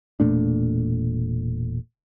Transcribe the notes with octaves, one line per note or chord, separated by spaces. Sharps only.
E1 A#2 A3 D4